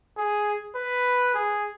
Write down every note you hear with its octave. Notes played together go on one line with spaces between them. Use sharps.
G#4
B4
G#4